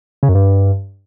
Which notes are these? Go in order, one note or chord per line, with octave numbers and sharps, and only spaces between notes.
C#3
F#2
G2